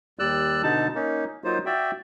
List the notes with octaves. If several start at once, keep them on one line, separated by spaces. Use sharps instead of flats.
D#2 G3 D5 E6 F#6
B2 D3 D#4 A5
A#3 C#4 D#4
F#3 A#3 D#4 F4 C5
F#4 D5 E5 G5